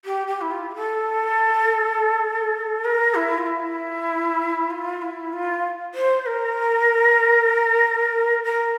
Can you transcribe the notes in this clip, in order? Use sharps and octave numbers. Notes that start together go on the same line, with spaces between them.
G4
G4
E4
F4
G4
A4
A#4
E4
F4
E4
F4
E4
F4
C5
A#4
A#4